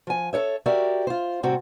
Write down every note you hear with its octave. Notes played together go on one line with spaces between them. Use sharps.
F3 G#5
A4 A#4 C#5 E5
F#4 G4 A#4 D5 E5
F4 C5
A2 C3 G3 C4 F#4